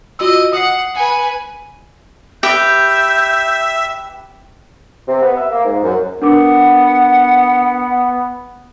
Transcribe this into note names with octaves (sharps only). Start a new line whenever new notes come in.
F4 F#4 D#5 E6
F#5 D#6 C7
B4 G#5 C#7
G4 B4 E5 G6
C3
B3
E5
A#3
G#2
F#2
B3 D4 A#4 F#5 D6